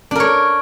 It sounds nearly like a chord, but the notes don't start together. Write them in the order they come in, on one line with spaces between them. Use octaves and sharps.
D4 A#4 C#5